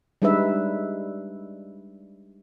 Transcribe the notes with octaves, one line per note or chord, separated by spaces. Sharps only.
G3 G#3 D4 D#4 B4 E5